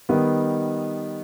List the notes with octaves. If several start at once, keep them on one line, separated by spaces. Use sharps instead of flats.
D#3 G3 B3 D#4